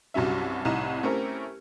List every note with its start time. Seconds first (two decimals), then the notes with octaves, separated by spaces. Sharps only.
0.14 C2 G2 F#3 C#4 E5
0.65 C2 A2 D#4 A#5 E7
1.03 A3 C4 C#4 E4 G4 A#4